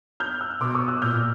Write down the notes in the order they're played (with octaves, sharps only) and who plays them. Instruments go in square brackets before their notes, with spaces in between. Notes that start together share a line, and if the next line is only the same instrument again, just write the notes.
[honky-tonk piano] F6 G6
E6 F#6
[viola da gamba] B2 [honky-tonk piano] C6 D6
[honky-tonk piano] C#6 D#6
E6 F#6
[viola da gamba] A#2 [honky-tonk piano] F6 G6